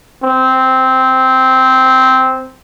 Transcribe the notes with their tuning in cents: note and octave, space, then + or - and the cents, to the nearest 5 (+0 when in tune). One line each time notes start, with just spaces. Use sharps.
C4 -5